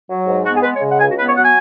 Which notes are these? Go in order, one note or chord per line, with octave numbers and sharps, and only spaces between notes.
F#3
G#2
B3 F#4
G#4
G#3 B4
C#5
C#3
F#5
C#2 G#5
F#4
B3 B4
C#5
F#3 F#5
G#5